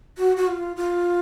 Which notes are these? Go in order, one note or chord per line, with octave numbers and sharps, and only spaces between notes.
F#4
F#4
F4
F4